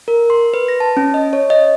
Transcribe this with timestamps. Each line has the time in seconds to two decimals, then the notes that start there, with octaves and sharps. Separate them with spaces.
0.08 A#4
0.30 C6
0.54 B4
0.68 A#6
0.80 A5
0.97 C#4
1.14 D#5
1.33 C#5
1.50 D#5